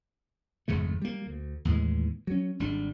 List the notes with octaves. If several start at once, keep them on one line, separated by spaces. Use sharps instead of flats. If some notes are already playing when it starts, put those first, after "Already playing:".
G#1 F2 C#3 A3
G3 A#3
D2
D#2 A2 E3 G#3
F#3 C#4
G#1 G3 D4